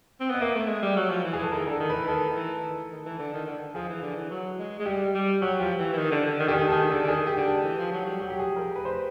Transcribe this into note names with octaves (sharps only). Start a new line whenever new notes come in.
C4
B3 D#5
A#3 E5
A3
G#3
G3
F#3
F3
E3
G#4
E3 A4
D#3 A#4
D3
A4
D#3
E3 B4
D#3 A4
E3
D#3
D#3
E3
D3
D#3
D3
F3 G#4
E3
D3
E3
F#3
G#3
G#3
G3 G4
G3
F#3 G4
F3 G4
E3
E3
D#3
D3
D3
D#3
D3 G4
D#3 G#4
A4
D#3 G#4
D3 A4
D3
D#3 G#4
G4
D3
A4
E3
F3
F#3
G3
F#3 G4
G4
G#4
F3
A#4
B4
C5